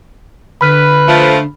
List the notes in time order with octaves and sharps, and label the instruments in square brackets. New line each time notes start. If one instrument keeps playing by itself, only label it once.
[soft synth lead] D3 [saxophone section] B4 [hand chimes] B5 F6
[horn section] F3 A3